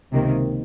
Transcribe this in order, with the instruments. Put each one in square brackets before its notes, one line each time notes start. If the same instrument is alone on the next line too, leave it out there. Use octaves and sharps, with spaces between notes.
[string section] C#2 C3 D#3 A#3